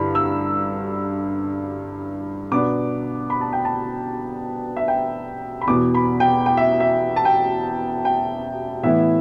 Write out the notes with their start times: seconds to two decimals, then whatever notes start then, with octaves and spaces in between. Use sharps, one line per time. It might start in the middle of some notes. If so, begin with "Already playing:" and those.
Already playing: G2 D3 E4 B5
0.15 E6
2.52 B2 B3 D4 D6
3.30 B5
3.41 A5
3.53 G5
3.65 A5
4.77 E5
4.88 G5
5.61 B5
5.67 E2 B2 B3 D6
5.94 B5
6.20 G5
6.46 G5
6.57 E5
6.80 E5
7.16 A5
7.25 G5
8.05 G5
8.83 A2 E3 B3 E4 E5